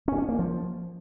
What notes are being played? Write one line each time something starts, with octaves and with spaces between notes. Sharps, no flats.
C#4
C#4
A#3
F3